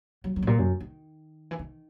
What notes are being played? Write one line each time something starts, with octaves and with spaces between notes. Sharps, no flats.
F#3
F#3
G#2
A#2
F#2
D#3
E3
D#3